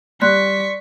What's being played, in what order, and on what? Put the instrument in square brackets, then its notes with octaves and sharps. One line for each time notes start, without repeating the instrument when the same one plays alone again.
[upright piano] G3 [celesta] D5 C6 [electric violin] C#6 B6 [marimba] F#6